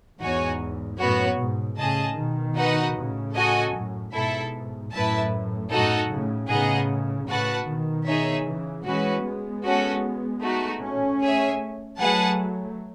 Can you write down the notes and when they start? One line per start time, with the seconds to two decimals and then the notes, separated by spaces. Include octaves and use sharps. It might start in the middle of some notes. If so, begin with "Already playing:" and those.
0.19 E2 G#2 D#4 F#4 C#5 G#5
0.98 F#2 A2 B3 F#4 C#5
1.38 G#2 B2
1.77 A2 C#3 G#4 D#5 A5
2.16 B2 D#3
2.56 D#4 F#4 B4 D#5 F#5
2.95 A2 C#3
3.35 F#4 A4 D#5 G#5
3.73 F#2 A2
4.13 G#2 B2 E4 A4 E5
4.91 F#2 A2 E4 B4 E5 A5
5.70 F#2 A2 D#4 F#4 A4 D#5 F#5
6.10 A2 C#3
6.49 A2 C#3 B3 D#4 G#4 D#5 F#5
7.27 A2 C#3 F#4 B4 F#5 A5
7.66 B2 D#3
8.07 D#4 G#4 C#5 E5
8.45 C#3 E3
8.85 E3 G#3 C#4 F#4 B4
9.24 G#3 B3
9.64 C#4 F#4 A4
10.42 A3 D#4 F#4
10.81 A3 C#4
11.22 G#4 C#5 E5 G#5
11.99 F#3 A3 G#4 B4 F#5 A5